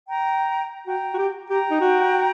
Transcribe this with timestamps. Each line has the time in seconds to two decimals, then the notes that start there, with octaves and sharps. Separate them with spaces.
0.08 G5 A#5
0.87 F#4 G5 A#5
1.14 F#4
1.18 G4
1.50 G4 G5 A#5
1.71 D#4
1.81 F#4